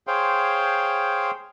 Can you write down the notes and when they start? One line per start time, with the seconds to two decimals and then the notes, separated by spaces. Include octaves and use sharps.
0.07 G#4 C5 C#5 F5 G5 C6